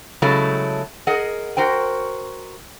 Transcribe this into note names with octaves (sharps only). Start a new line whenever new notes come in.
C#3 F#3 G#3 A3 E4 A4
G#4 A#4 D#5 F#5
F#4 A#4 C5 G5